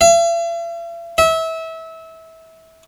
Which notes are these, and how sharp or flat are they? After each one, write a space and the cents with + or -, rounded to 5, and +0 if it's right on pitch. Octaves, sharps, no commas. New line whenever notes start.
E5 +45
E5 -25